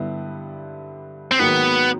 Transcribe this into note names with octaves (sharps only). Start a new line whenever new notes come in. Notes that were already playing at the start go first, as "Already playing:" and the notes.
Already playing: G2 D3 G3 B3 E4
C4
G#2 D#3 F#3 A#3 B3